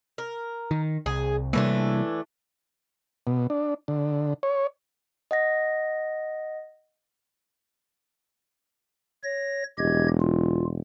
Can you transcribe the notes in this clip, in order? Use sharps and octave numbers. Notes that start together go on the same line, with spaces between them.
A#4
D#3
C2 G#4
C3 E3 G3 A3 A#3 D4
B2
D4
D3
C#5
D#5 F#5 A#6
C#5 A#6
E1 G4 D#5 G#6
F4